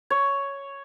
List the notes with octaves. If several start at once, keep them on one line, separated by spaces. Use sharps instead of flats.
C#5